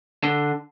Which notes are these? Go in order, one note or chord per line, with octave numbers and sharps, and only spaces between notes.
D3